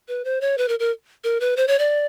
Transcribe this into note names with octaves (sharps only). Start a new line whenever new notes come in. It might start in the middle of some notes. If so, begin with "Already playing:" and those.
B4
C5
C#5
B4
A#4
A#4
A#4
B4
C5
C#5
D5